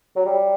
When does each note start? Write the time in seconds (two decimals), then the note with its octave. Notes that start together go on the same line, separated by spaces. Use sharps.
0.16 F#3
0.26 G3